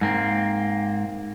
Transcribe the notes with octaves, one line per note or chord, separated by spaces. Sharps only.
G#2 A#3 C4